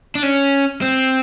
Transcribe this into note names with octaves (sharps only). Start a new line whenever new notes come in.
D4
C#4
C4